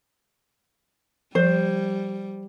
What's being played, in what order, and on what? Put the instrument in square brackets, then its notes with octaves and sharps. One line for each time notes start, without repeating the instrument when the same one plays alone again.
[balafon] F3 [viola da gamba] G3 [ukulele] C5